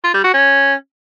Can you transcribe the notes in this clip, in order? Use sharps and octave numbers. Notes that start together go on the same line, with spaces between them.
F4
G3
F#4
C#4